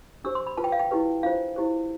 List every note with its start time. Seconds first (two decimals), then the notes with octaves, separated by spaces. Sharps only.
0.24 D4 G4 C5 E6
0.35 C6
0.47 B5
0.57 F4 B4 A5
0.64 G5
0.72 F5
0.79 G5
0.91 E4 G4 B4
1.23 D4 F4 C5 F5
1.56 E4 G4 C5